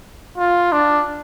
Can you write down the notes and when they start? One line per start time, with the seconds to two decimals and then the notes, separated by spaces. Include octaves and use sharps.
0.38 F4
0.72 D4